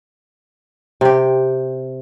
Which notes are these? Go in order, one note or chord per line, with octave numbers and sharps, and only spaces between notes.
C3 G4